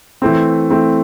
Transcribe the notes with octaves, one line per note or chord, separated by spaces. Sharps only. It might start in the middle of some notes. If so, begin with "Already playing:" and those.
E3 A3 C4
E3 A3 C4